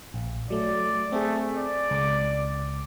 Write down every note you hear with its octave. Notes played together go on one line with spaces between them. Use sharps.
A#1
F#3 A3 D5
A3 C4 G#4
D5
C#2 D6